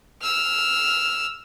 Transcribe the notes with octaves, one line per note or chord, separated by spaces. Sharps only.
E6 F6